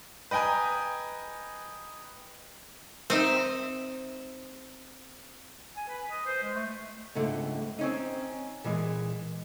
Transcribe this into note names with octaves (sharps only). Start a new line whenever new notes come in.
B4 D#5 G5 G#5 A#5
C4 D#4 E5
G#5
B4
D#5
C5
G#3
A3
C#2 G#2 D3 A3
C4 C#4 D#4
A#2 E3 G#3